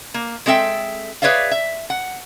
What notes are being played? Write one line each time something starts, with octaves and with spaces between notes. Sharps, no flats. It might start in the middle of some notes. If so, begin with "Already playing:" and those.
A#3
G#3 C4 A4 E5 G5
G#4 B4 C#5 D5 E5 F5
E5
F#5